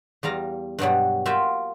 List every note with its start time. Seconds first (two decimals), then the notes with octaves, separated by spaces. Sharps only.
0.23 E2 G3 F5 A#5
0.79 G2 B2 F#3 G3
1.25 A#3 F4 F#4 E5 F5 G5